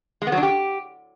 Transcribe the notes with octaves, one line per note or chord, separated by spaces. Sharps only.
G#3
B3
F#3
D4
G4